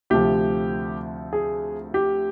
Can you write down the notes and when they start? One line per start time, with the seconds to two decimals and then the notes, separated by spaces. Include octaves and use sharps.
0.10 D2 C3 F3 G4
1.33 G#4
1.94 G4